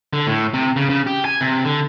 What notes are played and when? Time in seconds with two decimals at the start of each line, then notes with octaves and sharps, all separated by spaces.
0.13 D3
0.27 A2
0.54 C3
0.76 C#3
0.89 C#3
1.07 G4
1.25 G#5
1.41 C3
1.65 D3